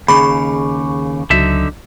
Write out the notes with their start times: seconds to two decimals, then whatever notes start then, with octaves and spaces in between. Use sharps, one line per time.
0.08 D#2 C#3 G#4 B5 C#6 D6
1.30 C#2 D3 F#3 D#4 E5